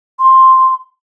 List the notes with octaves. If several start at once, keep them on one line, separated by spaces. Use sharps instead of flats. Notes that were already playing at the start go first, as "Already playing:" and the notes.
C6